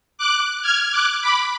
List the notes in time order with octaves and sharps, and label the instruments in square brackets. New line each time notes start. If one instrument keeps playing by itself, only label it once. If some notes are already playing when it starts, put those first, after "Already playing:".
[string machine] D6 F#6
F6 G#6
D6 F#6
B5 D6